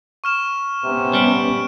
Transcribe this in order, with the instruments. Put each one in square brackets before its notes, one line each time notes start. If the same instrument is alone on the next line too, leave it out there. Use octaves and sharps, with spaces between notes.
[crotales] C#6 F6 E7
[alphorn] C3 [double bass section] B3 C#4
[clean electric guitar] G3 [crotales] F6 D7 E7